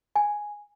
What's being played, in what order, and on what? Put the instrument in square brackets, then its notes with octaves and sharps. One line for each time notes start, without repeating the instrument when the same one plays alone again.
[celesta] G#5